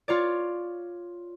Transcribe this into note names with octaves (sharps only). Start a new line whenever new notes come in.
F4 C#5 D5